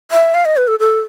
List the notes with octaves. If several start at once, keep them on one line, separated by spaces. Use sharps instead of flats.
E5
F5
D#5
B4
A4
A4